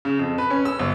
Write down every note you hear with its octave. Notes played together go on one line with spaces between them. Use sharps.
C#3
F2
B4
C#4
E6
G1